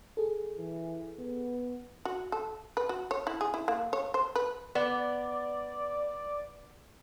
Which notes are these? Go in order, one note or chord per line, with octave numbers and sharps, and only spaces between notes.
G#4 A4
E3
B3
F#4
A4
B4
F#4
C#5
E4
G#4
E4
A#3
C#5
C5
B4
B3 D5